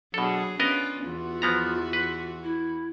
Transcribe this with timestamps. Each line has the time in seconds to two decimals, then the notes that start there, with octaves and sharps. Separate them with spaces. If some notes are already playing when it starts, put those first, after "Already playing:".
0.14 B2 F#3 D4 G#4 A4
0.60 B3 C#4 D4 F4 A#4 D#5
1.04 E2 E3 F4 F#4
1.42 F3 B3 A#5
1.93 B4
2.44 E4